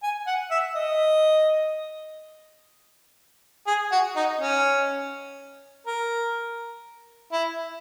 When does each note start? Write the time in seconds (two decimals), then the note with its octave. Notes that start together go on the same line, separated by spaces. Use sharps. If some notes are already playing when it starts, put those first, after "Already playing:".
0.03 G#5
0.27 F#5
0.51 E5
0.76 D#5
3.67 G#4
3.92 F#4
4.16 D#4
4.41 C#4
5.87 A#4
7.32 E4